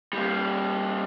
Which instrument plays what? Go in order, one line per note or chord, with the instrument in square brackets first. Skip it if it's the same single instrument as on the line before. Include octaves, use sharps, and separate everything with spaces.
[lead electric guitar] G3 A#3